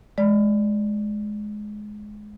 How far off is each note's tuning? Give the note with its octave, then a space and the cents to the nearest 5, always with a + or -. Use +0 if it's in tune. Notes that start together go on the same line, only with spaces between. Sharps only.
G#3 +15 D5 +0